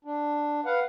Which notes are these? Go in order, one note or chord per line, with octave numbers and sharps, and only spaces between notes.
D4
B4 F5 F#5